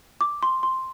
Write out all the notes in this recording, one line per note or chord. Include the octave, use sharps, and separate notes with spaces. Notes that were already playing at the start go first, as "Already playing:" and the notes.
D6
C6
C6